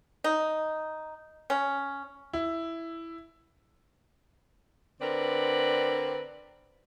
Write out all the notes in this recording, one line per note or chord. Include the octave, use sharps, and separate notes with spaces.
D#4
C#4
E4
D3 C4 A#4 B4 D5